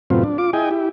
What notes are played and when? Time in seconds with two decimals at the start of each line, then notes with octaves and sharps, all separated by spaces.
0.10 F#2 A2 C3 B3 C4 F4
0.24 D4
0.38 F4 D6
0.53 E4 G#4 D#5 G5 G#5
0.71 E4 G4